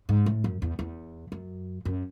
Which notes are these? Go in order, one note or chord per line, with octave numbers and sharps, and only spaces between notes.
G#2
A2
F#2
E2
E2
F#2
F#2